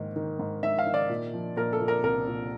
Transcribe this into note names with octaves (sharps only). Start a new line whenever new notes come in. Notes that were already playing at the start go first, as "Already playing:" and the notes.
Already playing: G#2 D#3 A#3
D#3
G#2
G#2 E5
F5
D#3
D5
A#2
F3
A#2 A#4
A4
A#2
A#4
C2 A#4
A#2